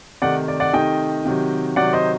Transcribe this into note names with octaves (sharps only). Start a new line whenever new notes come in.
C3 D#3 A3 D#4 D5 F#5
D5
D5 F#5
C3 D#3 A3 D#4 D#5 G5
C3 D#3 F#3
C3 D#3 F#3 D5 F#5
C5 D#5